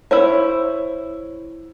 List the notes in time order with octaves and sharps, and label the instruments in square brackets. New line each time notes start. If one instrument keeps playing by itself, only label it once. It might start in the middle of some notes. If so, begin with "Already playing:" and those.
[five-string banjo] E4 C5 C#5